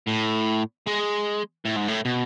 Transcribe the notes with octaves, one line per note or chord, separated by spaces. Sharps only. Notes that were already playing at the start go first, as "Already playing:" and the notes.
A2
G#3
A2
G#2
A2
B2